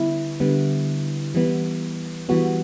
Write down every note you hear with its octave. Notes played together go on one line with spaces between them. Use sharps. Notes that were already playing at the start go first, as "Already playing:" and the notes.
Already playing: D3 G3 B3 E4
D3 G3 B3
E3 G3 B3
E3 G3 B3 F#4